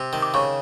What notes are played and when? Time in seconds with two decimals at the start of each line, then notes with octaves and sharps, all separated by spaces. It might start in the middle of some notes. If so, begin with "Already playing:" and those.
Already playing: C3
0.13 D#3
0.22 D6
0.34 C#3 C#6